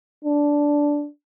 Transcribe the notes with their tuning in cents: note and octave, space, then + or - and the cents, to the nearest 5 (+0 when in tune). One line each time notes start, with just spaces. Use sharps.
D4 -10